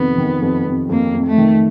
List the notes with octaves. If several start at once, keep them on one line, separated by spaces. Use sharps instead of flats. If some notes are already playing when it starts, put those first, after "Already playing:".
Already playing: F2 C3 D#3 B3
D#3
F2
F2
F2 A#3
F2
A3
D#3